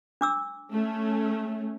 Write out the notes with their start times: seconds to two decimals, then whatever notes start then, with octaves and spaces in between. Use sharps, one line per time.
0.21 D4 D6 E6
0.72 A3 C#4